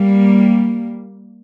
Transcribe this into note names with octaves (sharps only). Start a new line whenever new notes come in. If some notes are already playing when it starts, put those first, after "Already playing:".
Already playing: G3 A#3